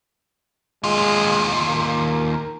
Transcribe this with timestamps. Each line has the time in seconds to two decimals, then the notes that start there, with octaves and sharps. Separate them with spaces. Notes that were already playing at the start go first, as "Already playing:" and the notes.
0.84 D#2 G#3 F4
1.69 A#4